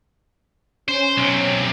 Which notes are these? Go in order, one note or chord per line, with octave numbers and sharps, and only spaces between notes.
C#4 C5
B1 C3